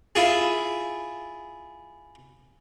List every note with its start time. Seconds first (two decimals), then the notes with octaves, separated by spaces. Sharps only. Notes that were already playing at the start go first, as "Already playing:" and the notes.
0.15 E4 F4 G#4